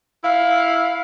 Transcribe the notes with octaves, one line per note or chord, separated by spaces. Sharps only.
E4 F5